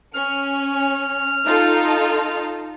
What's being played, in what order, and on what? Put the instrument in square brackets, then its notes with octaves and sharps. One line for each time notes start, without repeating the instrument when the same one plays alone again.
[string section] C#4 [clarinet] F6
[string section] D#4 F4 A4